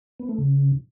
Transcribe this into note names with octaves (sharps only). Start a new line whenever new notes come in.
B3
A3
C#3